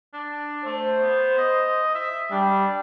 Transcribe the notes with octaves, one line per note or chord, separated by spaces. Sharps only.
D4
A3 C5
B3
D#5
E5
G3 D4